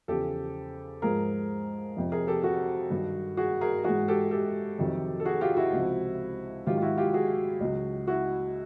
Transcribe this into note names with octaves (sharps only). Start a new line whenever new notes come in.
E2 C#3 F3 G4 A4
G#2 F3 G#4 A#4
F2 C3 F3
G#4 A#4
G4 A4
F#4 G#4
G2 D#3 F#3
F#4 G#4
G#4 A#4
G#2 E3 F#4 G#4
G4 A4
G4 A4
F2 C3 D#3 F#3
A4
F#4 G#4
F4 G4
E4 F#4
C#2 C3 F3
G#2 D#3 F#3 F4 G4
F4
E4 F#4
F4 G4
F#4 G#4
C#2 C#3 F#3
E4 F#4